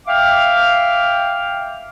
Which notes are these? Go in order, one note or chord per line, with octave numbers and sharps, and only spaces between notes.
E5 F5 G5 D6 F6